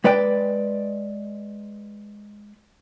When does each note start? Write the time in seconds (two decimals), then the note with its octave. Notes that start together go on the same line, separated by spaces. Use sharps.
0.04 G#3 B4 D5 G5